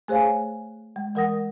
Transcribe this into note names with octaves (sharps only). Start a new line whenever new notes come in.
A3 G#4 C5 C#5 F5 G#5
G#3
E3 G#3 A#4 F#5 D#6 A#6